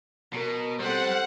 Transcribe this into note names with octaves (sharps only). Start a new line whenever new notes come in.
B2 A#4
G3 C4 A4 C5 F#5